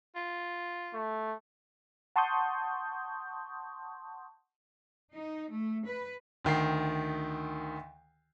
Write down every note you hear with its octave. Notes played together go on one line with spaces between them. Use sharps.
F4
A3
F#5 A5 C6 C#6 D#6 G6
D#4
A3
B4
D2 D#3 G5 C7